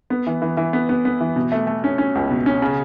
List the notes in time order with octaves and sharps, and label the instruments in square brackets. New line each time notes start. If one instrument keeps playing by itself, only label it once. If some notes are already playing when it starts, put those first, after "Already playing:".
[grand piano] B3
E3
E3
E3
B3
B3
B3
E3
B2
A3
A3
C#4
C#4
C#2
B2
C#4
C#3